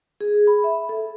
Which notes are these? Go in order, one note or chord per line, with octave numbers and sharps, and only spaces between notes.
G#4
B5
E5
A4